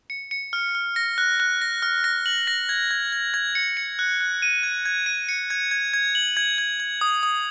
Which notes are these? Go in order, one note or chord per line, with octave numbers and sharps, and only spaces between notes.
C#7
C#7
F6
F6
A#6
F#6
F#6
A#6
F6
A#6
F#7
A#6
G#6
G#6
G#6
G#6
C#7
C#7
F#6
F#6
D#7
G#6
G#6
D#7
C#7
G#6
G#6
G#6
F#7
G#6
G#6
G#6
D#6
D#6